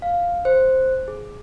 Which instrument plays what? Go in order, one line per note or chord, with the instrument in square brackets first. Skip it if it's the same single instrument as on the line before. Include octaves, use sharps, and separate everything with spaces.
[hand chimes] F5
C5
G#4